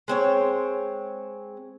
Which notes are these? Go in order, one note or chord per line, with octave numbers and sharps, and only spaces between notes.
G#3 C4 C#5